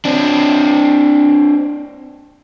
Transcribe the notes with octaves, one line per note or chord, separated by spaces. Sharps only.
C4 D4